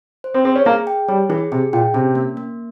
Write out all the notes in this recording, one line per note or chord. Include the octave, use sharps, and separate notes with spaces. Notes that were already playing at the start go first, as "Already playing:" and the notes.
C5
C4
C4 G#4
C#4
A#3 G#4
G5
G3 C#5
E3 G#4
C3 G#4
A#2 G5
C3 C#4
A#3
A#3